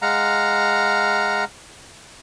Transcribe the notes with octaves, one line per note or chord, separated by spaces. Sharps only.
G#3 F5 F#5 A#5